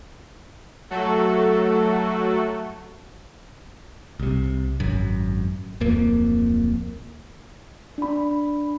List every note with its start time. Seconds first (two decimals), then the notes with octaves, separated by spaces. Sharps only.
0.90 F#3 A3 F#4 A4
4.20 C2 C3
4.80 G#1 F#2
5.80 D1 F2 A#3
7.98 D4 B5